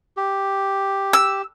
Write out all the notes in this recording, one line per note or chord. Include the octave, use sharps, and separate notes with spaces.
G4
E6